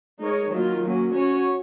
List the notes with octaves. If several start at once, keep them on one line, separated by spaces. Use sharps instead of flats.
G#3 D#4 A#4 C#5
D#3 F#3 A#3 F4
F#3 A#3 C#4
C#4 F#4 C#5